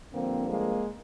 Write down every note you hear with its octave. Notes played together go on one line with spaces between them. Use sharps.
G2 D3 F3 A#3 C4
G#3 A#3